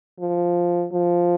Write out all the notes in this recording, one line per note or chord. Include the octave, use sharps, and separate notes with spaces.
F3
F3